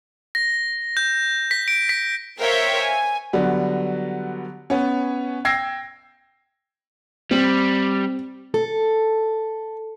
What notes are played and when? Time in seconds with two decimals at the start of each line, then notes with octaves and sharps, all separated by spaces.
0.35 A#6
0.97 G6
1.51 B6
1.68 D7
1.89 B6
2.40 A#4 C5 C#5 E5 F5 G5
2.85 G#5
3.33 D3 F#3 G3 B3
4.70 B3 C#4
5.45 G5 E6 G#6 A#6 C7
7.31 G3 C4
8.54 A4